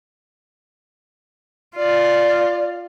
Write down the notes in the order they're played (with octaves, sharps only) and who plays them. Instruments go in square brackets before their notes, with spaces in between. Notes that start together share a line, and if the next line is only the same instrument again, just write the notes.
[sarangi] F4 [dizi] D5